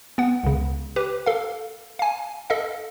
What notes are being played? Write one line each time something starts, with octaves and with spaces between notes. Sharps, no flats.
B3 F#5
C#2 C#3
G4 B4
A4 F5
F5 G#5
A4 D#5 F5